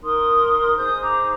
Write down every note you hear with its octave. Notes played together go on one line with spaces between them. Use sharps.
D#4 A#4 C6 D#6
D#4 G#4 C5 D#6 G6
A#5 D6